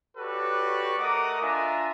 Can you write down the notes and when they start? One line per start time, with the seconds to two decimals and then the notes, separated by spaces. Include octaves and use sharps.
0.17 F#4 G4 A4 B4 C#5 D5
0.99 A3 A#4 D#5 F#5 D6 D#6
1.41 D4 F4 E5 G#5 A#5